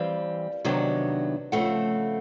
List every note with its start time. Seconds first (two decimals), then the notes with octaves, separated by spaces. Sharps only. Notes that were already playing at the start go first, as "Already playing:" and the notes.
Already playing: E3 G3 C4 F5
0.65 C3 D#3 F#3 B3 D4
1.52 C#3 F3 A3 C4 F#5